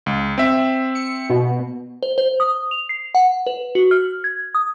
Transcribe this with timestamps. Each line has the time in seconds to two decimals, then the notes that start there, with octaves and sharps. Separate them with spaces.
0.06 C#2
0.38 C4 E5
0.95 C#7
1.30 B2
2.03 C5
2.18 C5
2.40 D#6
2.71 F7
2.89 C7
3.15 F#5
3.47 B4
3.75 F#4
3.91 F6
4.24 G#6
4.55 D#6